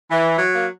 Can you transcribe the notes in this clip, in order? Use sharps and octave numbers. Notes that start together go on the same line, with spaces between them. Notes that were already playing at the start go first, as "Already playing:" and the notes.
E3
F#3
A#3